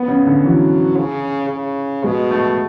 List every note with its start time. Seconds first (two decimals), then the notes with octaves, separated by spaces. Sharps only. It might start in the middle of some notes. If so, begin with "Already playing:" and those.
Already playing: B3
0.08 C#3
0.27 D3
0.44 E3 F#3
0.97 C#3
1.50 C#3
2.04 B2 G#3
2.31 A3